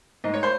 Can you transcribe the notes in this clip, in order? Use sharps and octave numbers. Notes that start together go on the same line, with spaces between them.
G#2 D#5
C#5
C5